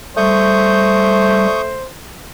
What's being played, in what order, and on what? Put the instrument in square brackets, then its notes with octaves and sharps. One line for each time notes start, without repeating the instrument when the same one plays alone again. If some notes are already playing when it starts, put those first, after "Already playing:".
[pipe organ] G3 [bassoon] A3 [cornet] C5 [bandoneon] C#6 D#6 G6